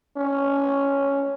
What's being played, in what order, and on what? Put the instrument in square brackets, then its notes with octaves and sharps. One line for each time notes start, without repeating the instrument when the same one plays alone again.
[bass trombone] C#4